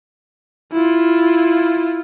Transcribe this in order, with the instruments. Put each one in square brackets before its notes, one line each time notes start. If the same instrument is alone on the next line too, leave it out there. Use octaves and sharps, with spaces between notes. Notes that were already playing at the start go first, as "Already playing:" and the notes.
[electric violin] E4 F4